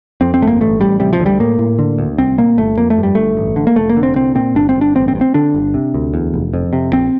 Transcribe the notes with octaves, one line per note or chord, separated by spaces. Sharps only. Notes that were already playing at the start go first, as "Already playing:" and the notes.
F2 C4
C4
G1 A3
A#3
A1 A3
A1 G3
C3 G3
F3
D2
G3
A2 A#3
A2
D3
D2
C2 C4
A#2 A#3
G1 A3
F2 A#3
A3
G2
G3
G1 A3
A1
D3
A#3
F1 A3
A#3
D3
C4
C2 C4
A#2 C4
G1 D4
C4
G1
D4
A1 C4
C4
G2
C4
D3 D4
G1
C3
D2
E2
F1
F2
C3
A#1 C4